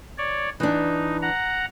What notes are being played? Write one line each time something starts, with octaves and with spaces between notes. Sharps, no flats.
C#5 D5
E3 D4 D#4
F#5 A#5